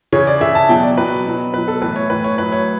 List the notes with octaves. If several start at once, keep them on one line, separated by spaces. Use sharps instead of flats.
C#3 E3 C#5
D5
C#3 E3 E5
A5
B2 F#3 G5
D5
B2 F#3 B4
B2 F#3
B2 F#3 B4
A4
A2 E3 B4
C#5
A2 E3 B4
C#5
A2 F#3 B4
C#5